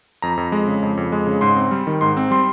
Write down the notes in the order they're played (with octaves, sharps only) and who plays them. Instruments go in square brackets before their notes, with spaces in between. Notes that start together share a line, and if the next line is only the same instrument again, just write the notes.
[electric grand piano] F2 A#5
F2
G#3
C#3
F2
F2
G#3
C#3
G#2 C6
C4
G3
D#3
G#2 C6
C4
G3 C6